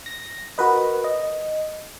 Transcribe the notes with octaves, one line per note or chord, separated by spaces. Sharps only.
A#6
F#4 A#4 B4 D#5
D#5